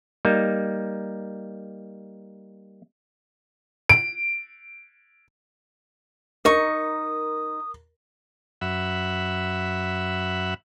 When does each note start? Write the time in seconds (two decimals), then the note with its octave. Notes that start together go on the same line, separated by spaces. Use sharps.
0.25 G3 A#3 D#4
3.89 D7
6.45 D#4 A#4 C#6 D#6
8.61 F#2 E5 F#5 B5